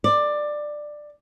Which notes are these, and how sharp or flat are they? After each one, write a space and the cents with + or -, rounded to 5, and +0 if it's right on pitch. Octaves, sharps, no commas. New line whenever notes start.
D5 +15